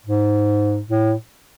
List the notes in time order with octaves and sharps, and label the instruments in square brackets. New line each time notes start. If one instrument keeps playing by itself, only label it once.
[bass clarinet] G#2
A2